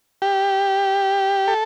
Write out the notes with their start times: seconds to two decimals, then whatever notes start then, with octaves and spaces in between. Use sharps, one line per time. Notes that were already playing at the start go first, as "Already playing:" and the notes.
0.22 G4
1.48 A4